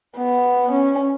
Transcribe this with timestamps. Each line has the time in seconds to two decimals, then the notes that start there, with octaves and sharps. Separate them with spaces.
0.17 B3
0.71 C#4